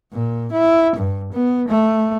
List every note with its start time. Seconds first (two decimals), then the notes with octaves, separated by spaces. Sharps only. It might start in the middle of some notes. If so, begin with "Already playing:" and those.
0.13 A#2
0.52 E4
0.96 G2
1.33 B3
1.68 A3